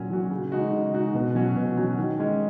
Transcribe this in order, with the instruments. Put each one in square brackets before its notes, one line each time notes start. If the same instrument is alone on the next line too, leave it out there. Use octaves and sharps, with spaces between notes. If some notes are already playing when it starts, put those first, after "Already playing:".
Already playing: [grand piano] A#2 F#3 C#4 F#4
F#3 C#4 F#4
C#3
G#3 D#4 F#4
C#3
G#3 D#4 F#4
B2
F#3 C#4 F#4
B2
F#3 C#4 F#4
D#3
G#3 C#4